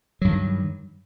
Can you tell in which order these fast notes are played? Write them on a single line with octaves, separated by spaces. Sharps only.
F#3 G2 D#3